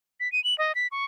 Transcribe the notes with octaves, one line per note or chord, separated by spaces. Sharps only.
B6
D#7
F#7
D#5
B6
C#6